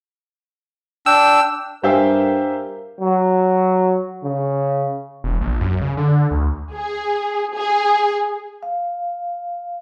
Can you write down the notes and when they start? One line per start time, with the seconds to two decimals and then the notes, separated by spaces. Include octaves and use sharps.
1.06 D4 G5 E6
1.84 G2 G4 A#4 C5 E5 F5 G5 G#5
3.01 F#3
4.24 C#3
5.24 E1
5.41 A#1
5.61 F#2
5.81 C#3
5.97 D3
6.31 D2
6.75 G#4
7.56 G#4
8.63 F5